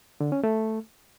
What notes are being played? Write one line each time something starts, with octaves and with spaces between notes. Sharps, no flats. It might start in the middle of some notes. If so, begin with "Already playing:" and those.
D3
C#4
A3